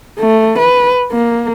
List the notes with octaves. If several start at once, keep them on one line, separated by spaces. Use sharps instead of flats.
A3
B4
A#3